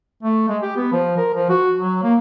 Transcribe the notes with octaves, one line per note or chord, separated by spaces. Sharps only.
A3
G#3
G4
B3
F3
A#4
F3
F#4
F#3
A#3